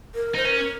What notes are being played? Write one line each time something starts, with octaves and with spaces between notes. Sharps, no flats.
A#4
D#4 C5
C#4 A#4